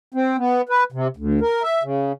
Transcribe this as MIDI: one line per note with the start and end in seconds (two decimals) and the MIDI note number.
0.14 0.37 60
0.38 0.62 59
0.69 0.84 71
0.92 1.07 48
1.17 1.40 38
1.41 1.63 70
1.63 1.83 76
1.83 2.12 49